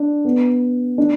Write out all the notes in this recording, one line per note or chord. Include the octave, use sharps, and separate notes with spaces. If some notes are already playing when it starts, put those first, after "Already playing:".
Already playing: D4
B3
D4